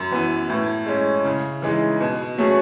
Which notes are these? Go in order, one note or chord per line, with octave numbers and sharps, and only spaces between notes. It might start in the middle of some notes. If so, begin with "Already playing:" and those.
Already playing: F#2
E3 B3
A2
G#3 C#4
C#3
E3 G#3 D#4
B2
F#3 A3 C#4 G#4